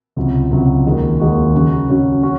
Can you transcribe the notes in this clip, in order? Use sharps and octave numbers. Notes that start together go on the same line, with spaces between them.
C#2 C3 F#3
C#2 C3 F#3
D#2 D#3 G#3 D#4 F#4
D#2 D#3 G#3 D#4 F#4
C#3 F#3 C#4 F#4
C#3 F#3 C#4 F#4
C#4 F#4